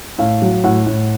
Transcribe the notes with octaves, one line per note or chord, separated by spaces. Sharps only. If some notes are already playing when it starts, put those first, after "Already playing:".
A2 F5
F#3
A2 F#5
A2